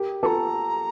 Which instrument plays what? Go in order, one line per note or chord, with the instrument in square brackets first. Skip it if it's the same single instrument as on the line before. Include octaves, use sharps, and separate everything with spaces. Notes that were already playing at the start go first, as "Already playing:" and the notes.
Already playing: [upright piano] G4 A#4
[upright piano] F4 A4 [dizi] A#5 D6